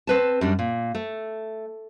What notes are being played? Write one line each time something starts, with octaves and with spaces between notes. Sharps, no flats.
C4 B4 A5
F#2 G3 D4
A#2
A3